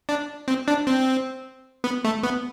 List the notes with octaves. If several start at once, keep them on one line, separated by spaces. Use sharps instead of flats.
D4
C4
D4
C4
B3
A3
B3